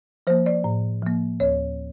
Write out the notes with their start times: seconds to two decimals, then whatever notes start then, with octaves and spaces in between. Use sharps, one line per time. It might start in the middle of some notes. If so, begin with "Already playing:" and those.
0.27 F3 A#3 C5
0.46 D5
0.64 A2
1.02 F3 A#3
1.40 D2 C#5